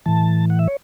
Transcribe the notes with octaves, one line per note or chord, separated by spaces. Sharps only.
A2 E3 A5
F#5
E5
C#5